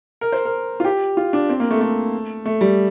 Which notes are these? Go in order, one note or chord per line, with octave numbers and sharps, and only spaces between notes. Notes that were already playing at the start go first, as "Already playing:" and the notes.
A#4
C5
A#4
F4
G4
F4
D4
C4
A#3
A3
A3
A3
G3